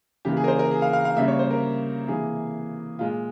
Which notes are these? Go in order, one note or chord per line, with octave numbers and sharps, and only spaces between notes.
C#3 E3 A#3 G4
G#4
A#4
C5
A#4
G#4
F5
F5
F5
C#3 G3 A#3 E5
C#5
C5
A#4
C3 E3 A#3 G#4
A#2 G#3 F4